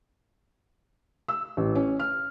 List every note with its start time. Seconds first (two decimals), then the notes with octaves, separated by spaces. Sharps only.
1.28 E6
1.57 A1
1.75 C#4
1.99 F6